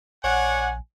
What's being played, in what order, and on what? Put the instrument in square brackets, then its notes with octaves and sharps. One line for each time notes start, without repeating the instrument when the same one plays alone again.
[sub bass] A#1 [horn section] C#5 D5 F#5 [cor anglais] G#5